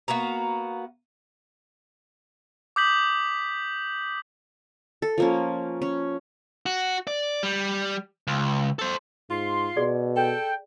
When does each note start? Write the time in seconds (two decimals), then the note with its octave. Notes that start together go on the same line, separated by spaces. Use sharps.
0.08 A#3 B3 F#4 A#5
2.76 D6 D#6 G6 B6 F#7
5.02 A4
5.18 F3 A#3 C#4
5.82 C#4
6.66 F#4
7.07 D5
7.43 G3
8.27 C#2
8.79 A4 C5
9.30 G#2 F4 C6
9.77 B2 G#4 D5
10.16 A4 G5